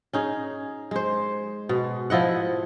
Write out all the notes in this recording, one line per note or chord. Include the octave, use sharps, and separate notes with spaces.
C#4 D#4 G#4
G#3 C5
B2
F3 E4 D#5 F#5